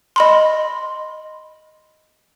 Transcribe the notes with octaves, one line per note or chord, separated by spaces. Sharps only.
D#5 B5 C6